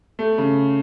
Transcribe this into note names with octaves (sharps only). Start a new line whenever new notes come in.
A3
C#3